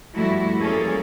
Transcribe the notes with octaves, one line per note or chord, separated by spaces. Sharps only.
G2 F3 A3 E4 F#4
E2 G3 A#3 C#4 G#4 A4